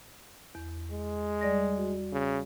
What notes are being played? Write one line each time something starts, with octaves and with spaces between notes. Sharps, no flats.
E2
G#3
G3 D5 A#6
F#4
C#3